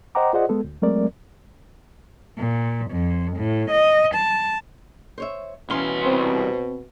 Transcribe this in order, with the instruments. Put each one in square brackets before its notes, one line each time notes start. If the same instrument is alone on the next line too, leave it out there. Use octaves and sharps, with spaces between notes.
[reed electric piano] C5 D#5 F#5 G5 A#5 D6
F4 G#4 C5 D5 D#5 F#5
G#3 B3 A4
D2
F#3 G#3 A3 C4 A#4 D5
[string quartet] A#2
F2
A2
D#5
A5
[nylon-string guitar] C5 C#5 E5
[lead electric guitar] C2 C6 [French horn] B2 [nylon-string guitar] E3 C#4 F5
[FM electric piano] C4